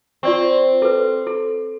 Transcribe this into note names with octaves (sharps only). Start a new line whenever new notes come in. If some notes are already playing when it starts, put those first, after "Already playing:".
C4 F4 D5 C#6
A4 B4
A4